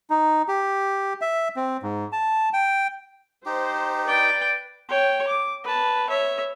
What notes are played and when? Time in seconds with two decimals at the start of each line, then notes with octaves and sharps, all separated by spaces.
0.10 D#4
0.48 G4
1.21 E5
1.56 C4
1.83 G#2
2.12 A5
2.53 G5
3.46 D#4 G4 C5
4.08 B4 D5 G5
4.89 C#5 G5
5.28 D6
5.64 B4 A5
6.10 C#5 E5